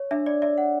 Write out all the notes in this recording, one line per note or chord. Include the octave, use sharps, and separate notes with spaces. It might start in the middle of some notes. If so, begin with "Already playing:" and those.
Already playing: C#5
D4 E5
D5
D5 E5
F#5